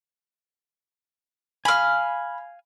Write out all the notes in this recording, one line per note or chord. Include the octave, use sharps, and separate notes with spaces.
F5 G#5 B5 F6